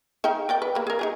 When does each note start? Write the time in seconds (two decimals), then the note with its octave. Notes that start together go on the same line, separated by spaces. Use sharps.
0.24 D#4 F5 G5
0.49 A#4 D5 G5
0.62 B4
0.75 A#3 B5
0.87 G#4 A#4
0.99 D#4 G4 G#4